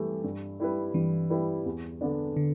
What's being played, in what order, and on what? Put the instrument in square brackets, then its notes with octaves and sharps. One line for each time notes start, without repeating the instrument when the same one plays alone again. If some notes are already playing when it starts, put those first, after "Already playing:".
Already playing: [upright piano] E3 A3 G4 [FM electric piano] G3
[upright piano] G2
G3 E4 B4
[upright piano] G2 [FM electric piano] E3
[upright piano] G3 E4 B4
E2
D3 B3 D4
[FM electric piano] D3